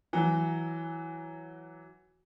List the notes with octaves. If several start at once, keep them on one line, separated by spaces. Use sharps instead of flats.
E3 F#3